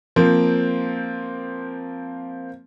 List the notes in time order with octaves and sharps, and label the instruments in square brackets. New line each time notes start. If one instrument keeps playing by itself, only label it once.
[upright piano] F3 A#3 C4